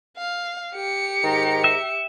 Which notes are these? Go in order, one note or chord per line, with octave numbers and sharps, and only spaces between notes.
F5
G4 C#7
G#2 D#3 A#5
E5